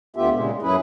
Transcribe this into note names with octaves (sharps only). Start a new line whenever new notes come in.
D2 D3 B3 F4 G4 E5
A#2 C#3 G#3
F#2 F#3 C#4 E4 G#4 B4